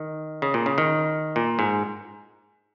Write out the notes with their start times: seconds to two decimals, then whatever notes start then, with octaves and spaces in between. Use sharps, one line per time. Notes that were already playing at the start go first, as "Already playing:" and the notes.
Already playing: D#3
0.42 C#3
0.54 A#2
0.66 C#3
0.78 D#3
1.36 A#2
1.59 G#2